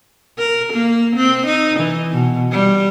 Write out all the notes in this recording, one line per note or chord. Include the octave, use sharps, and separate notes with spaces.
A#4
A#3
C4
D#4
E3
B2
G3